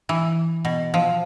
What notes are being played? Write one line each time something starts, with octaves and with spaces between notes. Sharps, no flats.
E3
B2
F3